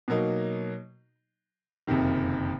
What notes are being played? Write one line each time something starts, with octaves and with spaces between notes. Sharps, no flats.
B2 F#3 A#3 D#4
F#1 F2 C3 D#3